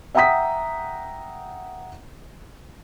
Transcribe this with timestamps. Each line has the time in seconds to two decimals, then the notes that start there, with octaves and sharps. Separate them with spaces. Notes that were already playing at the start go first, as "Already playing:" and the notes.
0.15 E5 F#5 G5 A#5 D#6 B6